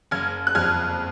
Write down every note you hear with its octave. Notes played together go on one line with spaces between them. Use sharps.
F#1 F6 G#6
F#6
F2 F6 G#6